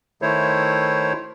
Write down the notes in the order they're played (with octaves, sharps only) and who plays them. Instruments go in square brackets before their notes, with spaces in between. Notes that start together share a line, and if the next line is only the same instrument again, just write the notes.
[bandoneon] D#3 A3 E4 C5 C#5